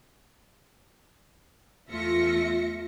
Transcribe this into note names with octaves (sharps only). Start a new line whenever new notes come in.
E2 A3 F4 E5 A#6 C#7